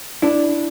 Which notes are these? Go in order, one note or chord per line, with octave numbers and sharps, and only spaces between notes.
D4 E4